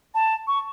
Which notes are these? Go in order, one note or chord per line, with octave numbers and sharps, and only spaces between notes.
A5
C#6